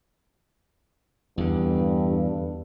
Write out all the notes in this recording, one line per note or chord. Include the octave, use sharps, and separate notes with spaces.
E2 G2 D3